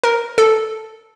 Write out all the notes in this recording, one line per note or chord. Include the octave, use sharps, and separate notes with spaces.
A#4
A4